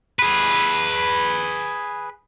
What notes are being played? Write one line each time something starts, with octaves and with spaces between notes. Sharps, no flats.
G#4 B4